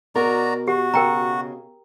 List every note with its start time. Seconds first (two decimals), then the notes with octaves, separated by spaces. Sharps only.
0.16 B2 F#4 A#4 D5 A#5
0.68 F#4 G4
0.94 C#3 A#4 G5 A#5